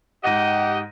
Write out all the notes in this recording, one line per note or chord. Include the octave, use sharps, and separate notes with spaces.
G#2 G4 D#5 F#5 A#6 D#7